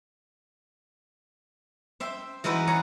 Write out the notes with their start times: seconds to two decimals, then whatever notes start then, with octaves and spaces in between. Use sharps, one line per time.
2.00 C5 E5 G5
2.44 E3 G#3 D#4 E4 F#4 B4
2.67 G#4 C#5 F#5 A#5